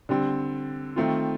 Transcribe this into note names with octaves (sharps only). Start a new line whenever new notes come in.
D3 G3 C4
D#3 A3 C4 F4